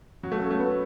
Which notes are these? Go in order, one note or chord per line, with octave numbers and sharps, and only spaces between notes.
F#3
A3
C#4
A3
B3